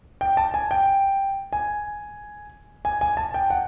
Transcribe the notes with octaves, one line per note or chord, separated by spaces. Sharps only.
G5
A5
G#5
G5
G#5
G#5
G#5
A5
G5
F#5